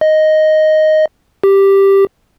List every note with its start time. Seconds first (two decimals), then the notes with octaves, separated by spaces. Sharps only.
0.01 D#5
1.44 G4